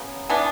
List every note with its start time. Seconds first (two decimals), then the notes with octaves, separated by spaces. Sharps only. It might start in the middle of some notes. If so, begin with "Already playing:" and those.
Already playing: C#3 F#3 B3
0.30 E3 B3 D4